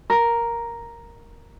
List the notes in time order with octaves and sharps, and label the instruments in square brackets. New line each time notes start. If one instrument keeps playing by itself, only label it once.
[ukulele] A#4